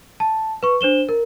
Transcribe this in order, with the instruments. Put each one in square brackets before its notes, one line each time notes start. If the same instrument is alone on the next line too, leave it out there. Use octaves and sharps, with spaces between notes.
[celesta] A5
B4 C#6
D4 C5 E7 G7
A#4